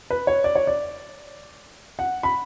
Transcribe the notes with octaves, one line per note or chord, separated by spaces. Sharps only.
B4
C#5
D5
C#5
D5
F#5
B5